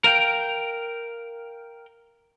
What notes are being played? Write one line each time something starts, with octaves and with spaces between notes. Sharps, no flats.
A#4 F5 G5